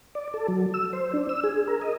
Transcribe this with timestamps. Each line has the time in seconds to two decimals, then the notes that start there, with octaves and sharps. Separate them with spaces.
0.15 D5
0.34 A4
0.48 F#3
0.74 E6
0.93 C5
1.13 D4
1.29 E6
1.44 G#4
1.68 A#4
1.81 D#5